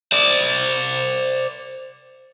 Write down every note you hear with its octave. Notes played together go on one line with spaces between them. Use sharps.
C5 D5